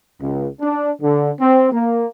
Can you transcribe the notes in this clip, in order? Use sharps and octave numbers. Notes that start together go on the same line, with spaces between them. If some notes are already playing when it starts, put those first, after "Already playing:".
C#2
D4
D3
C4
A#3